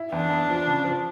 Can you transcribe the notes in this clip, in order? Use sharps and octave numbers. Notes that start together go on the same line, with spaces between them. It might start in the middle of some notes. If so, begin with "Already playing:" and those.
Already playing: E4
E2 D4
E2
F3
C#3
F3